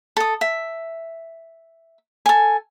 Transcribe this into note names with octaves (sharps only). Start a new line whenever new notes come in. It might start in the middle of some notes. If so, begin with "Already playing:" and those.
A4 D#6
E5
A4 G#5